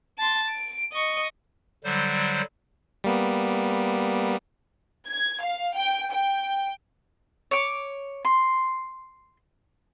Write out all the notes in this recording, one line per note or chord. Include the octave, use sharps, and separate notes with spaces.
A5 C6
D7
D#5 C#6
D3 F#3 G3 C5
G3 A#3 B3
G#6
F5
G5
G5
C#5 D6
C6